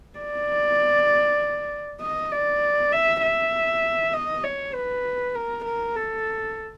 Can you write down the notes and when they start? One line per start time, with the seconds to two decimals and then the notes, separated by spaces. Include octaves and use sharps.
0.19 D5
2.01 D#5
2.32 D5
2.92 E5
3.22 E5
4.13 D#5
4.44 C#5
4.74 B4
5.35 A#4
5.65 A#4
5.96 A4